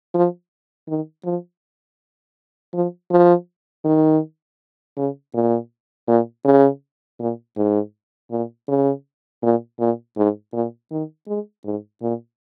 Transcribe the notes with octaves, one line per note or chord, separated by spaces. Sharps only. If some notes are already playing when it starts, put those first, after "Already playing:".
F3
D#3
F3
F3
F3
D#3
C#3
A#2
A#2
C#3
A#2
G#2
A#2
C#3
A#2
A#2
G#2
A#2
D#3
G#3
G#2
A#2